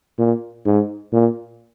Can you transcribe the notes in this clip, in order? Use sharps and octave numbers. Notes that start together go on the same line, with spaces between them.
A#2
G#2
A#2